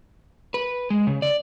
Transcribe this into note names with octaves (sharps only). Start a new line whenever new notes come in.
B4
G#3
C#3
D5